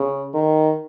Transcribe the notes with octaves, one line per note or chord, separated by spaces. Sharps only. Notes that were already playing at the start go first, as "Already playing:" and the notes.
Already playing: C#3
D#3